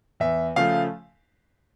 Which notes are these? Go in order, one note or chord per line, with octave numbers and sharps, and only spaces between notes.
E2 E5
C#3 F3 A3 F5